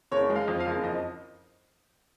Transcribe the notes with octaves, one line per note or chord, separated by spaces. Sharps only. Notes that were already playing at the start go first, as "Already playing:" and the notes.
F#1 C#5
G#3
F5
F2
F5
F#1
F2 D#5